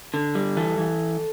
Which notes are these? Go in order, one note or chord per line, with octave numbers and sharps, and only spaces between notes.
D3
G3
E3 A4
E3